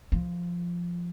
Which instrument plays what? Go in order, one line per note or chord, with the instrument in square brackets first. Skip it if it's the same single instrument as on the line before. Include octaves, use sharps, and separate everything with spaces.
[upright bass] F3